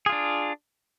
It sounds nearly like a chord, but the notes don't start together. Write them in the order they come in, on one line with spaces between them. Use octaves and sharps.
G#4 F4 D4